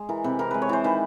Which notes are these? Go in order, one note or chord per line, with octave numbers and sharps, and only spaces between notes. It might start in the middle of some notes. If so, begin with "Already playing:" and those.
Already playing: G#3
E3 A#4
C3 B4
E3 A#4
G#3 B4
C#5
E3 C5
D#3 B4